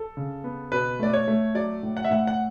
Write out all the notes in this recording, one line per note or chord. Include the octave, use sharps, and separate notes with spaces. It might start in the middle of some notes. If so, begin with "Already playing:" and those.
Already playing: A4
C#3
B3
B2 B4
A3 D5
C#5
A3
F#3 D5
A2
F#5
E5
A2 F#5
F#5